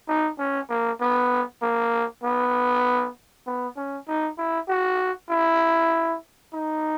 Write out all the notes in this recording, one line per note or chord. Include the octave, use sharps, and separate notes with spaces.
D#4
C#4
A#3
B3
A#3
B3
B3
C#4
D#4
E4
F#4
E4
D#4